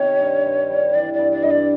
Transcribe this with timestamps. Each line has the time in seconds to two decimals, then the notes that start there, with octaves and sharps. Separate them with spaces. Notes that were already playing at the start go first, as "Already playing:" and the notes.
Already playing: C3 D#3 C4 C#5
0.19 G2
0.44 G2
0.70 G3
0.94 E3 D5
1.14 D5
1.19 G2
1.32 D5
1.43 G2 D#5
1.51 D5